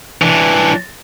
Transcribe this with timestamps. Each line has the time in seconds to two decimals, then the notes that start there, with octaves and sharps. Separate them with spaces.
0.22 E3 D4